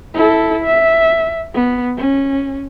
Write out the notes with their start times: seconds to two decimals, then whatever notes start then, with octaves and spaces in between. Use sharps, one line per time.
0.14 E4 A4
0.65 E5
1.54 B3
1.97 C#4